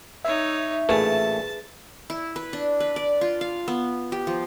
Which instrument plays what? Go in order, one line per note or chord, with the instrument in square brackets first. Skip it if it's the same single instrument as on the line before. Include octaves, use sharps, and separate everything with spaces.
[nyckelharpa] D#4 C#5 [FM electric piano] E5
[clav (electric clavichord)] A1 A#2 A3 [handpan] G#4 B4 [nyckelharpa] A5
[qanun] E4
B4
D4
B4
D5
F4
F5
B3
G4
F3